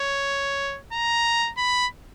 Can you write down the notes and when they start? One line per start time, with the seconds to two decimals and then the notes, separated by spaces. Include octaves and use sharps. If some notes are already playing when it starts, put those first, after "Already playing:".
Already playing: C#5
0.93 A#5
1.57 B5